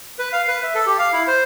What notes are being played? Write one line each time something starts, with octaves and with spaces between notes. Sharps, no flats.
B4
F5
B4
E5
A4
G4
F5
E4
C5